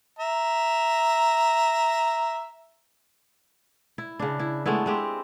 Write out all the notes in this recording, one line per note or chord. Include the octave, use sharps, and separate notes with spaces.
E5 A#5
E4
C#3 D4
E4
G#3 A3 B3 E4
G#3 C4 G4